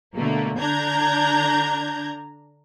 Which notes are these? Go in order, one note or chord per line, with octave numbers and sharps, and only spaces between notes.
B2 D3 A3 A#3
D3 D4 A#5 G6 G#6